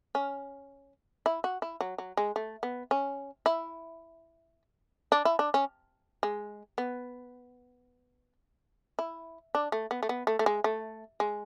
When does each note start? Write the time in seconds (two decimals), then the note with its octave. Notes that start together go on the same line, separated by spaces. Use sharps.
0.15 C#4
1.26 E4
1.44 F#4
1.62 E4
1.81 F#3
1.98 F#3
2.17 G#3
2.36 A3
2.63 B3
2.91 C#4
3.46 E4
5.12 D4
5.25 E4
5.39 D4
5.54 C#4
6.23 G#3
6.78 B3
8.99 E4
9.55 D4
9.72 A3
9.91 B3
10.03 A3
10.09 B3
10.27 A3
10.39 A3
10.46 G#3
10.64 A3
11.20 G#3